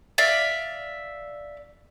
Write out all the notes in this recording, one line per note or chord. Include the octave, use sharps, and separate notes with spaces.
D5 E5 F5